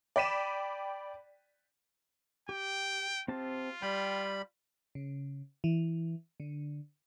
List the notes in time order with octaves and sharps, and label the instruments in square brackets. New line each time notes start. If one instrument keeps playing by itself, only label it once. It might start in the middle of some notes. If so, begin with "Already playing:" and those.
[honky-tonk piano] D5 G5 B5 B6 D#7 E7
[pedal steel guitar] G4 [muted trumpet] G5
[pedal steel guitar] C4 G4 A5 [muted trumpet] F4
[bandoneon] G3 B5 [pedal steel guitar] G5
[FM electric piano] C#3
E3
D3